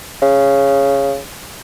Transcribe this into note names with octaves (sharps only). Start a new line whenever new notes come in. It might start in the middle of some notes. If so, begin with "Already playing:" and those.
C#3